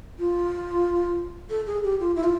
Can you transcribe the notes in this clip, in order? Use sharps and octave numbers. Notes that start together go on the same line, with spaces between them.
F4
A4
G#4
G4
F4
E4
F4